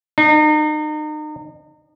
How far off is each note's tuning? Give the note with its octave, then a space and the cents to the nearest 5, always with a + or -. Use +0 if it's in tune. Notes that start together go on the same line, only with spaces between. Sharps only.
D#4 -35